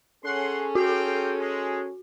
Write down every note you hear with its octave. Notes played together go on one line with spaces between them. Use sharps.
C#4 G#4 A4 F#5 C6
C4 F#4 F5 G5
G#3